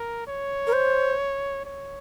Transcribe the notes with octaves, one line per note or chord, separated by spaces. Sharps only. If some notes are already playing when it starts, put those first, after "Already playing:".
Already playing: A#4
C#5
A#4
C5
C#5